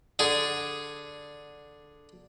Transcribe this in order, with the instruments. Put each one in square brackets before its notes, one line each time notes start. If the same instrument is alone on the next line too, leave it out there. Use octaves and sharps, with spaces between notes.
[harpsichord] D3 G#4